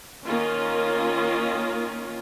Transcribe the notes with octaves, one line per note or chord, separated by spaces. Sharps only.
D#3 A#3 C#4 F4